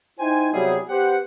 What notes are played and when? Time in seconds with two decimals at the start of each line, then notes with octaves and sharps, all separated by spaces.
0.19 D#4 E4 C5 G5 G#5
0.52 C3 F#3 G3 B3 E4 G#4
0.89 B3 G4 C5 F#5